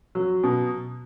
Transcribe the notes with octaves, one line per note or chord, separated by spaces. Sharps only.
F#3
B2